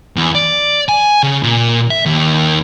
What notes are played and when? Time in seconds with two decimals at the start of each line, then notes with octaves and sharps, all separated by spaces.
0.16 E2
0.35 D5
0.89 G#5
1.23 C#3
1.43 A#2
1.90 E5
2.06 D#2